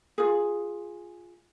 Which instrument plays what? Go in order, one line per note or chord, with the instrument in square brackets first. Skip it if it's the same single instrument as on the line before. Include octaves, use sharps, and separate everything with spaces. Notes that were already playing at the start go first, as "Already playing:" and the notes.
[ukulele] F4 G#4